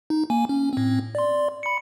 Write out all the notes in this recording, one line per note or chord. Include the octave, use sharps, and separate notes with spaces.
D#4
A#3 G#5
C#4
A2 C4
D5 C6
B5 C#7